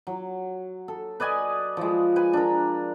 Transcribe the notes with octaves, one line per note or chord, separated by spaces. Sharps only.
F#3
A4
B4 D5 D#5 G#5
F3 G#3
B4 G#5
D4 A#4